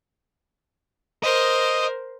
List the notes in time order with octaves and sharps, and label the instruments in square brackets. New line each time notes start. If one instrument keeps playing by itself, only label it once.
[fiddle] A#4 C5 [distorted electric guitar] D#5